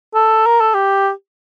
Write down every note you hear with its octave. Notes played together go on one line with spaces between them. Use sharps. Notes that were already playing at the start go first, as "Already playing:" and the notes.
A4
A#4
A4
G4